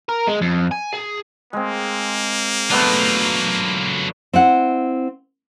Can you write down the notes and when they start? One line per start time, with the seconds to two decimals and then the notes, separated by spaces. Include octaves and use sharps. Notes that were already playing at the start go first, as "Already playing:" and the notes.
0.09 A#4
0.27 G#3
0.42 F2
0.71 G#5
0.93 G#4
1.53 G#3 A#3 C4
2.71 F#3 A3 B3 D4 F4
4.33 C4 E4 F#5